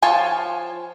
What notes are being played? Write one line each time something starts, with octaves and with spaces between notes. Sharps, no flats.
F3 F4 C#5 G#5 A5